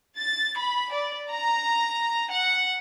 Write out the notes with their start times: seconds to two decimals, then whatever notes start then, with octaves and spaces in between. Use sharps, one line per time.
0.16 A6
0.58 B5
0.92 D5
1.31 A#5
2.29 F#5